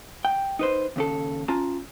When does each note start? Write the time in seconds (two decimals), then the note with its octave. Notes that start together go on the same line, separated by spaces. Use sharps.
0.25 G5
0.59 D#4 B4 C5
0.96 D#2 C#3 A4
1.48 C#4 F4 A5 A#5